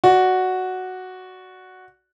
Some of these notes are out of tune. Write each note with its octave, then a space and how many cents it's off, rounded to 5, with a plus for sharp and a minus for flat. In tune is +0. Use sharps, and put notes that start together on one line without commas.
F#4 +0 D5 +0